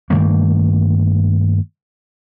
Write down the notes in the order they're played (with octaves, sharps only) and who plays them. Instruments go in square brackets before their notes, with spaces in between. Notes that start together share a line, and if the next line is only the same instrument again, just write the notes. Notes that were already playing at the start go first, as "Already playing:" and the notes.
[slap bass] G2 D#3 A3 A#3